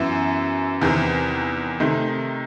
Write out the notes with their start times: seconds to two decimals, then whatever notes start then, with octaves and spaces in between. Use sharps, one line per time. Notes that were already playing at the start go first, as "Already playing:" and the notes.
Already playing: F#2 E3 B3 E4
0.81 E2 C3 D#3
1.80 C3 D#3 A3 D#4